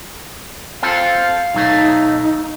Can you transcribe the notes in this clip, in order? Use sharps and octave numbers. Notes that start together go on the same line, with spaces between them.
C4 F4 A4 F5
B1 F#3 A3 D#4